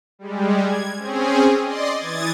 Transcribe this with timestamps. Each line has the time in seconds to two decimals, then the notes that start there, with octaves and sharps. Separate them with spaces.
0.19 G3 G#3
0.64 G#6
0.97 C4 C#4 G#4
1.63 D5 D#5 C6
1.97 E3 D#6 G#6 A6